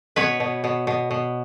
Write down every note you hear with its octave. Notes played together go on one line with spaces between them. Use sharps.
B2 B4 C#5
B2
B2
B2
B2